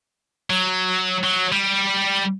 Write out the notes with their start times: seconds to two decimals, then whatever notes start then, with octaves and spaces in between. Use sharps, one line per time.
0.50 F#3
1.23 F#3
1.52 G3